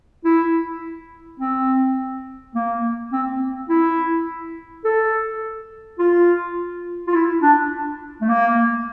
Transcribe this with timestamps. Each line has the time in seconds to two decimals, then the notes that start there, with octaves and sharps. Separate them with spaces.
0.24 E4
1.40 C4
2.55 A#3
3.13 C4
3.69 E4
4.85 A4
5.99 F4
7.07 F4
7.14 E4
7.42 D4
8.21 A3
8.29 A#3